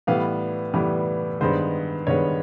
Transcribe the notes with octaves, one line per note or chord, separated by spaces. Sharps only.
A2 E3 G3 B3 F5
A2 E3 G3 B3
G2 D#3 G#3 B3 C5
G2 D#3 G#3 B3 C#5